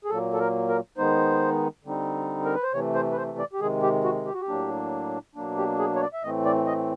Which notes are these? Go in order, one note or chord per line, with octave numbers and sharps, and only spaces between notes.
G#4
A#2 F#3 A#3 A4
A4
A#4
A#4
D#3 G#3 B3 D#4 C5
D3 G3 C4 D#4
A#4
B4
C5
C3 E3 A3 C#5
C5
B4
C5
D5
G4
C3 D#3 G#3 G#4
G4
F#4
G4
F#4
G4
A2 F#3 A#3 D4
B2 F#3 A#3 D4
G4
G#4
C#5
D5
E5
A2 E3 A3 C4 D#5
D5
D#5